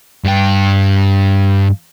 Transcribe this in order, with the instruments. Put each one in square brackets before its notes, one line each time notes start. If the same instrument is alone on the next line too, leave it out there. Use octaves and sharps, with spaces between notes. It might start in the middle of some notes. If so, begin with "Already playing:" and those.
[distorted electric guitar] G2 G5